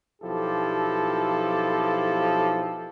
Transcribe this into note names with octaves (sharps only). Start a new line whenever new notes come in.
B1 F3 E4 G4 A4